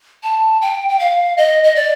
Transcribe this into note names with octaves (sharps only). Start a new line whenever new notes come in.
A5
G5
G5
F5
D#5
D#5
D5